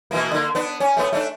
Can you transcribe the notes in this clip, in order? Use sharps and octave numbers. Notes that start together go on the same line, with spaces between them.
B2 E3 A#3
D3 A#3
B3 D4
C#4
A3 B3
A3 D4